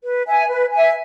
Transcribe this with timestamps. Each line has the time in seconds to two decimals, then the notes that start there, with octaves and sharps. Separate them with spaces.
0.04 B4
0.27 E5 G#5
0.49 B4
0.72 E5 G#5